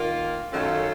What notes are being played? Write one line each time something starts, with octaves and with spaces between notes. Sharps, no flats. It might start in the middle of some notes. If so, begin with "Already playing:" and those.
Already playing: D#3 A#3 F4
F#2 D#3 A3 C#4 F4